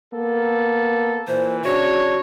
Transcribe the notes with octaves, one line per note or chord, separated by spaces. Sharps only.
A#3 B3 A4
A#2 E3 C5
C#3 D4 F#4 C#5